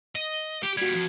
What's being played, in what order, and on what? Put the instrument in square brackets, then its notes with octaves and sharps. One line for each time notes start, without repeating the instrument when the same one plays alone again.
[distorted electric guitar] D#5
G4
[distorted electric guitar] A#2 G3 [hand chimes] F#4 G#6
[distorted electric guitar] F2